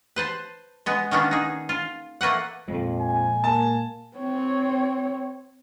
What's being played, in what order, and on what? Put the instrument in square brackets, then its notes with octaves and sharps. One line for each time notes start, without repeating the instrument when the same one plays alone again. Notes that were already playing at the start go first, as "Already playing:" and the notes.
[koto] B4 C5 A5
G#3 B3
D#3 A#3 B3 C#4 D4
D#4 G#4
F4
A3 A#3 B4 F#5
[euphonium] F2 [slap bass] A#2 G#3
[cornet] G#5
[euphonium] A#3 [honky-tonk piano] A5
[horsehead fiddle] C4 C#5